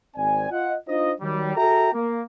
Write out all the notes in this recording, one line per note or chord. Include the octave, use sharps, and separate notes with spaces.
G#1 C4 D5 G#5
F4 D#5 F#5
D4 D#4 F4 C5 D#5
D#3 F#3 G3
F#4 G#4 A4 E5 G5 A#5
A#3